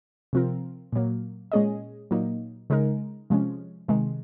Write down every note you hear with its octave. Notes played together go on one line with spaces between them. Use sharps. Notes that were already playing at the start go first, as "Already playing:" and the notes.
C3 F3 C4 F4 A#4
A#2 F#3 A#3
A#2 G#3 C#4 G#4 D#5
A#2 F#3 A#3 D#4
C#3 G#3 D#4 A#4
C3 F3 G#3 C#4
C3 D#3 G#3